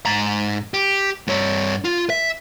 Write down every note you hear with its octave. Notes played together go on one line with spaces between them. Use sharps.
G#2 A#5
G4
G2 C#5
F4
E5